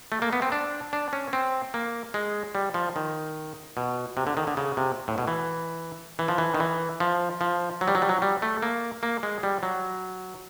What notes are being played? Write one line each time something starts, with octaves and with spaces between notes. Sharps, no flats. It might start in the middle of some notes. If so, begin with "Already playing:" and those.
A3
A#3
B3
C4
D4
D4
C#4
C4
A#3
G#3
G3
F3
D#3
B2
C3
D3
D#3
D3
C#3
C3
A2
B2
E3
E3
F3
E3
D#3
E3
F3
F3
F#3
G3
F#3
G3
F#3
G3
A3
A#3
A#3
G#3
G3
F#3